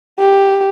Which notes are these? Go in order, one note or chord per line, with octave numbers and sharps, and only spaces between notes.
G4